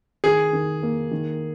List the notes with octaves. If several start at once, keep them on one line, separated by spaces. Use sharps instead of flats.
D#3 G#4
D#3
A#3
D#3